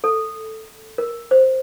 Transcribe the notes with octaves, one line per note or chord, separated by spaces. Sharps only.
A4
A#4
C5